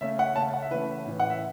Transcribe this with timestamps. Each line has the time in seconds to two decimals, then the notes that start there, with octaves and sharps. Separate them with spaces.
0.01 C#3 A3 C#4 E5
0.19 F#5
0.36 C#3 A3 C#4 A5
0.53 F#5
0.62 E5
0.71 E3 A3 C#4 B4
1.06 A2 E3 C#4
1.20 F#5
1.30 E5